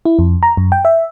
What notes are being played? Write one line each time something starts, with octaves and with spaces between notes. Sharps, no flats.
E4
F2
A#5
F#2
G5
E5